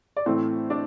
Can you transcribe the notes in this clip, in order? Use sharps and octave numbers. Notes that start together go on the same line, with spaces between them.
D5
A2 E3 A3 C4 C5
D4 D5